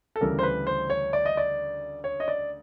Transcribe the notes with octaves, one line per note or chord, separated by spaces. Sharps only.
A4
D2 C#3 E3 G3 A#4
C5
B4
C5
C#5
D5
D#5
D5
C#5
D#5
D5